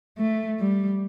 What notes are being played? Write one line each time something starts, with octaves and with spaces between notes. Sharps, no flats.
A3
G3